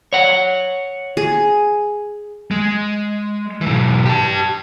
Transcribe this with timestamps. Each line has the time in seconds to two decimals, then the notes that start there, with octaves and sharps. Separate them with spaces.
0.13 C#5 F#5
1.17 G#4
2.51 G#3
3.61 B1 E3
4.06 G4 A5